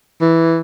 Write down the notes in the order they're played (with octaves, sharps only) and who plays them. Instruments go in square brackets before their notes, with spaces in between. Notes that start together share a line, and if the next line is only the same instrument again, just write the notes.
[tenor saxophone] E3